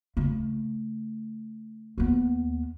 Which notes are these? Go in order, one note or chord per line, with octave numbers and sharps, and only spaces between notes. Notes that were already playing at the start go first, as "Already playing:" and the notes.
C#3 A3
D#2 B3